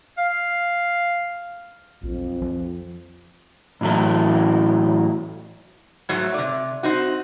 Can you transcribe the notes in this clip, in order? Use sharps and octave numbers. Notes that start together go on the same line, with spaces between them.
F5
B1 F2
F3
A2 E3 F#3 E4 A4
G#2 F#3 A3
C3 D5
C4 D#4 F#4